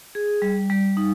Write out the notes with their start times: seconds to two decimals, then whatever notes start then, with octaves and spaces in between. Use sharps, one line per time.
0.15 G#4
0.42 G3
0.70 G3
0.97 D#4